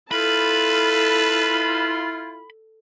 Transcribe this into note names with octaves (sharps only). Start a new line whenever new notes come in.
E4 F4 A4 B4 A5 B5